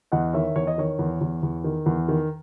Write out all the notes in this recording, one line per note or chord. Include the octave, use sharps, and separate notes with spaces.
E2 D#5 F#5
D#3 C#5 E5
E2 C#5
D#5
D#3 C#5
E2
E2
E2
D#3
E2
D#3